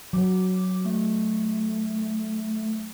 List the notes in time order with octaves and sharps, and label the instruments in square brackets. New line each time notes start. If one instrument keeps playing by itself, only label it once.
[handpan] F#3 [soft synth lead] D6
[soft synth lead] A3